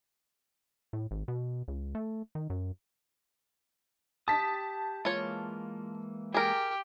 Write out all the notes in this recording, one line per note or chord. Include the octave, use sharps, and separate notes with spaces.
A2
G#1
B2
C#2
A3
D#3
F#2
G4 A5 D#6 B6
E3 G#3 A#3 F4 C#5
G4 G#4 A#4